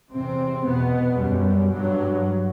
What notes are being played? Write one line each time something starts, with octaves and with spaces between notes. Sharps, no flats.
E2 C3 C4
E2 B2 B3
F#2 G3
G2 F#3